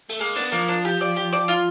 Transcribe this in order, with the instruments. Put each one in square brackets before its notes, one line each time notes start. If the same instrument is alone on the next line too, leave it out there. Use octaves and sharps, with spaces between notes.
[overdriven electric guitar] A3
[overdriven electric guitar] G#3 [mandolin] A#3
[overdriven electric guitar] B3 [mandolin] D4
[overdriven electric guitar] F3 [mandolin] A#3
[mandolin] D4
G4
D5
G4
D5
F4